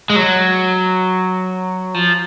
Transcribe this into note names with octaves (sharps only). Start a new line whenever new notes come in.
G#3
F#3
F3